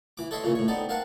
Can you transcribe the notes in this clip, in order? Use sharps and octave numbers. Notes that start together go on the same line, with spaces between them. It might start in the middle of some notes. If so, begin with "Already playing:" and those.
E3 D6
A4 C#5 D#5 E5 C6
A#2 C#3 E3 A#3 C#4
A2 C#5
B3 C4 D#4 A4 D5
C4 A#4 F5 F#5 A5